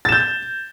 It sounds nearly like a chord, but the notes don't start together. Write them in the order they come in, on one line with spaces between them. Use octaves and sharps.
A6 E7 G6